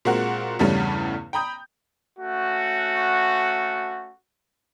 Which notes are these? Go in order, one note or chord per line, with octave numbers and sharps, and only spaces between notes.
A#2 G#3 C4 F#4 A#4 F#5
E2 G2 C#3 G3 A3 C#4
G5 A#5 B5 D#6 G6
A3 C#4 F#4